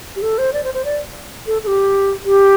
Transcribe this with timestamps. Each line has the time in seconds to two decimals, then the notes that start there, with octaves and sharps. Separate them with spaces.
0.16 G4
0.22 A4
0.38 C5
0.53 D5
0.64 C5
0.74 C5
0.85 D5
1.47 A4
1.64 A4
1.67 G4
2.25 G4